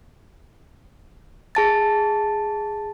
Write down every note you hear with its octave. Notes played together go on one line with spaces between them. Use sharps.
G#4 A5 A6